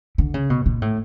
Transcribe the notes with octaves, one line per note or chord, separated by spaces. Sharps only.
D3
C#3
B2
A#2
A2